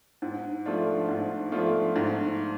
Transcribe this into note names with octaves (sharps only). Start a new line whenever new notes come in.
G#2
F3 A3 D4 F4
G#2
F3 A3 D4 F4
G#2